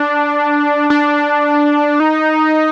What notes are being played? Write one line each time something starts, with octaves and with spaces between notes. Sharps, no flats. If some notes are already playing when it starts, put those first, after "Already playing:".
Already playing: D4
D4
D#4